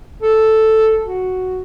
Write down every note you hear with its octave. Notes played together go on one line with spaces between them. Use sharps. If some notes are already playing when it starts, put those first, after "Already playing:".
A4
F#4